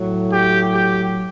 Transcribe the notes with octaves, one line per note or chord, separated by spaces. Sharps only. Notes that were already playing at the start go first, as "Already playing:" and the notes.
Already playing: A2 F#3
G4
G4